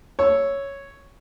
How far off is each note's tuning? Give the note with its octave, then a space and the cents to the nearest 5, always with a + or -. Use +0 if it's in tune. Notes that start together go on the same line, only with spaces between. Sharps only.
C#5 +0 E6 +0